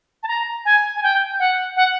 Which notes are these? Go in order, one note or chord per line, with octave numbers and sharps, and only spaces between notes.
A5
A#5
G#5
G#5
G5
F#5
F#5